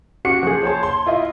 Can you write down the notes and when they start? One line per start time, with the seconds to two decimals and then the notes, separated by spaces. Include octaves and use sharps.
0.25 C#4 F#4 D6 C#7
0.43 F3 G#4
0.63 C5 C#5 A5
0.83 C6
1.06 E4 F4 D#5